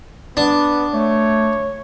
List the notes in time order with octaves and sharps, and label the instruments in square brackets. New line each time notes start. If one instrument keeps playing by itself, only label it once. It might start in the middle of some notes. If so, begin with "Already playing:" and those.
[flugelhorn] B3 [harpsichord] D4
[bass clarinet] A3 [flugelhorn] C#5